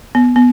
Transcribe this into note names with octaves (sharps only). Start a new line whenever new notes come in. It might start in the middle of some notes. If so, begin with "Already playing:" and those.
B3
B3